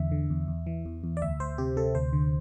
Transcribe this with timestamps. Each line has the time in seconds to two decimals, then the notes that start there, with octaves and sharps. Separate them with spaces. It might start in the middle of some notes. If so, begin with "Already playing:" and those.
Already playing: E2 D3 E5
0.12 D3
0.30 E2
0.48 E2
0.67 E3
0.86 E2
1.04 E2
1.17 D5
1.22 D2 E5
1.40 D2 C5
1.58 C3 G4
1.77 C3 A4
1.95 D2 C5
2.13 D3